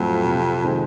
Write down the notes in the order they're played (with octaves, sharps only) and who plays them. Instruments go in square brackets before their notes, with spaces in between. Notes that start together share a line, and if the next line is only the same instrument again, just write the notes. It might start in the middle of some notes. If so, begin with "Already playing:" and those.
Already playing: [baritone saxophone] F2 [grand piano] A2 F#3 A3 C4
[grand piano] C3
D#3 G#3 C4